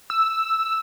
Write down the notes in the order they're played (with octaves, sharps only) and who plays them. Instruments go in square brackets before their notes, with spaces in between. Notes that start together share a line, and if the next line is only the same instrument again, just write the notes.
[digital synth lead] E6